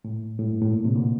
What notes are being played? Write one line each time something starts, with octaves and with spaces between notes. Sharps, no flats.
A2
A2
G2
A2
A#2
A2 C3
A#2 D3